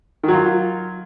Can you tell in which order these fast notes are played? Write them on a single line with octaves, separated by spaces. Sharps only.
D#3 F#3 F4